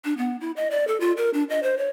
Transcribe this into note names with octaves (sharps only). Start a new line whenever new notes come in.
D4
B3
E4
D#5
D5
A4
F4
A#4
D4
D#5
C5
C#5